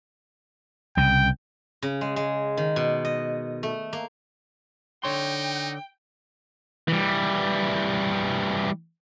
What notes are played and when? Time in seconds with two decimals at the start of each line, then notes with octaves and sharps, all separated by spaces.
0.97 C2 C#3 G5
1.82 C#3
2.01 G#3
2.16 G#3
2.57 D#3
2.76 B2
3.05 D#5
3.63 A3
3.93 A#3
5.04 D3 D#4 C#5 G5 C6
6.88 E3 G3